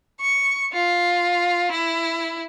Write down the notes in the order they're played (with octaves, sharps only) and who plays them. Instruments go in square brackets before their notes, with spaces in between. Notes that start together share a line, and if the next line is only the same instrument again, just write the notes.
[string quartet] C#6
F4
E4